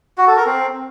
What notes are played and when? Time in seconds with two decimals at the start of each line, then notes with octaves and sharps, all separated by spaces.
0.18 F#4
0.27 A4
0.37 A#4
0.46 C4